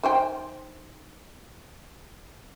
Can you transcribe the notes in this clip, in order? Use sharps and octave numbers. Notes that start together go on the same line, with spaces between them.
D#3 C5 G5